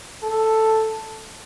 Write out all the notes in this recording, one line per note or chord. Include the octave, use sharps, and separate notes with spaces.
A4